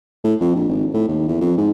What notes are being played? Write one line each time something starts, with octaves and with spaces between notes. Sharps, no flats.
A2
F2
A#1
G#1
A2
D#2
E2
F2
G#2